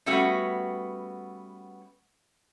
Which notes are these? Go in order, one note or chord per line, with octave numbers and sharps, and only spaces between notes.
G3 A3 B3 C#4 F#4